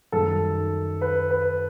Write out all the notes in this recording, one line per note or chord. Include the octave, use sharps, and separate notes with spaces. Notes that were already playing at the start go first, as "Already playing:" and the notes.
F#2 D#3 G3 A4
B4
B4